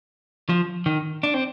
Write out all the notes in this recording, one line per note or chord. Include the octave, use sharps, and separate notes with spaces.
F3
D#3
D4
C4